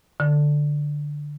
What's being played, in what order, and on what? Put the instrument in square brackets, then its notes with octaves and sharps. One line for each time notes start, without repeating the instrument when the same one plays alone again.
[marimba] D3